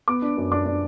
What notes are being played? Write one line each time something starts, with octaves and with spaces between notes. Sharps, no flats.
B3 D6
D4
F#2
D4 D6
D4